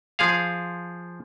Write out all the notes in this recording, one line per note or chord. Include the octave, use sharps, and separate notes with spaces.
F3 G#4 F5